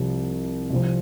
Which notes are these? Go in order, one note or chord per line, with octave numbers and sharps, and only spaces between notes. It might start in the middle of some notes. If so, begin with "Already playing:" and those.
Already playing: C2 C3 F3
C2 C3 F3